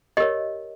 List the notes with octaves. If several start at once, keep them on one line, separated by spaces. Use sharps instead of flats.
G4 A#4 C#5 D#5